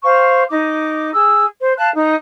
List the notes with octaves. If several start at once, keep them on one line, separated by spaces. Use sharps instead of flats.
C5 F5 C#6
D#4 D6
G#4 E6
C5
F5 A5 F#6
D#4